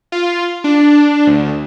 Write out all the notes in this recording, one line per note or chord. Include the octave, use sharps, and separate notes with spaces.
F4
D4
D2